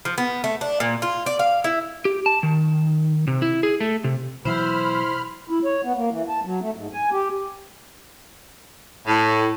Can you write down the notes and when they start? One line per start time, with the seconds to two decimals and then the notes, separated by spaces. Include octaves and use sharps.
0.05 F3
0.18 B3
0.44 A3
0.61 D4
0.80 A#2
1.02 F4
1.26 D5
1.39 F5
1.64 E4
2.05 G4
2.26 A5
2.43 D#3
3.27 C3
3.42 E4
3.63 G#4
3.81 A3
4.04 C3
4.45 B2 E3 F#3 E4 C5 B5 F6
5.50 E4
5.65 C#5
5.84 B3
5.97 A#3
6.11 E3
6.29 A5
6.45 F#3
6.61 A3
6.76 G#2
6.93 G#5
7.12 G4
9.07 A2